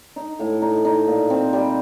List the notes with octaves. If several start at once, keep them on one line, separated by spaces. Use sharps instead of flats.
D#4
A2
D#4
D#4
A#2
C4
G3